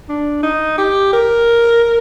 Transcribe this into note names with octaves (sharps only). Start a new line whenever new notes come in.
D4
D#4
G4
A#4